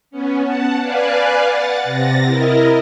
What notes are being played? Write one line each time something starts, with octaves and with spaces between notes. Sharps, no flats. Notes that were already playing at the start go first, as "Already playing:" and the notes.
B3 C#4
F#5 A5
B4 D5 F5 G#5 F#6
F#5 A6
C3 A6 A#6
E4 A#4 D#5